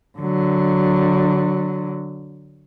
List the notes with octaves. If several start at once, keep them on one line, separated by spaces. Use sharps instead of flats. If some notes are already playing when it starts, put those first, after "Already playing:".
D3 F#3